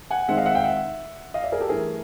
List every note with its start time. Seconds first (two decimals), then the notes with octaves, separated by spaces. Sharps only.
0.11 F#5 G#5
0.28 D#3 G#3 C4 E5 F#5
0.37 D#5 F5
0.46 E5 F#5
0.55 F5 G5
0.64 E5 F#5
1.34 D#5 F5
1.43 D5 E5
1.52 G#4 A#4
1.60 G4 A4
1.69 G2 E3 A3 G#4 A#4